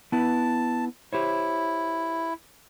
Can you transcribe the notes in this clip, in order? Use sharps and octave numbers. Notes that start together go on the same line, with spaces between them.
B3 E4 B4 A5
E4 G4 C5 C#5